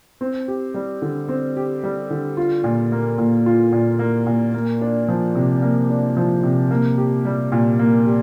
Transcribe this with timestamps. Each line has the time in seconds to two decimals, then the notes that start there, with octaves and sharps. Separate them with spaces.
0.21 C4
0.48 G4
0.74 G3
1.02 D3
1.29 C4
1.56 G4
1.83 G3
2.10 D3
2.37 F4
2.64 A#2
2.92 A#3
3.18 A#2
3.46 F4
3.72 A#2
3.99 A#3
4.26 A#2
4.54 A#3
4.81 D4
5.08 F3
5.35 C3
5.62 A#3
5.90 D4
6.17 F3
6.43 C3
6.71 A#3
6.98 G4
7.25 G3
7.52 A#2
7.79 A#3
8.06 G4